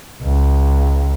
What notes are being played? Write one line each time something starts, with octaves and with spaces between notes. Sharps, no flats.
C#2